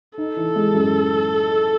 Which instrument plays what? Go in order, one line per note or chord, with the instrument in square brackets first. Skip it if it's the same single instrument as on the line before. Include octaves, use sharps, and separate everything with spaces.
[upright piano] D#4 [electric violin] A4
[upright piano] E3
G#3
F#2